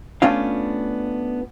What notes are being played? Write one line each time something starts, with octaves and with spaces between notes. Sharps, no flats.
A3 B3 C#4 D4 F4 F5